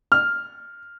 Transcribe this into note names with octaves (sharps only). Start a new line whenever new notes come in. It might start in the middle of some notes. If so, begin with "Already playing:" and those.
F6